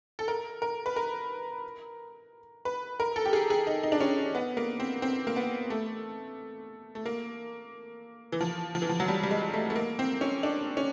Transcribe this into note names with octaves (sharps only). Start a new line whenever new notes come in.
A4
A#4
A#4
B4
A#4
B4
A#4
A4
G4
G#4
G#4
D#4
D#4
D4
C#4
B3
A#3
C4
C4
A#3
B3
A3
A3
A#3
E3
F3
F3
E3
F3
F#3
G3
G3
G#3
A3
A3
A#3
C4
C#4
D4
C#4